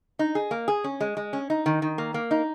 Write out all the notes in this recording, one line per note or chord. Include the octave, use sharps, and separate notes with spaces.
D#4
G#4
A#3
G#4
C#4
G#3
G#3
C#4
D#4
D#3
D#3
A#3
A#3
D#4